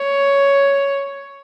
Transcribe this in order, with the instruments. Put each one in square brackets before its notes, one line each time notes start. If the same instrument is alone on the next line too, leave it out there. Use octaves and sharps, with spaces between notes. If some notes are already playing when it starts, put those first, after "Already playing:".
Already playing: [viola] C#5